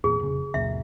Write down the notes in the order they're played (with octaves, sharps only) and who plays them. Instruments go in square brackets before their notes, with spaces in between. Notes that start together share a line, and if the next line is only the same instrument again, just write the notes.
[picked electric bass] E2 A#2 [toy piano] G#4
[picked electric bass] F1 C#3
[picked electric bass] C#2 F#2 A#2 [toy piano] E5